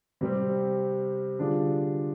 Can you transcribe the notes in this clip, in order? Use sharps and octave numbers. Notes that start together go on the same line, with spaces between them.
C3 G3 C4
D3 G3 D4 F4 G#4